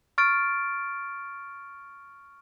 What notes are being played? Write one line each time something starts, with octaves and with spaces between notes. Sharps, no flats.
C#6 F6 A6 D7